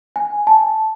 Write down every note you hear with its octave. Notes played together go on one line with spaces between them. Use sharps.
G#5
A5